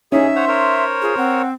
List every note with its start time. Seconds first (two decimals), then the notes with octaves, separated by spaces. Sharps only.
0.12 C#4 D#4 G#4 E5
0.35 C5 C#5 F#5 C6
0.48 A#4 C5 C#5
1.02 F4 G#4
1.17 C4 F#5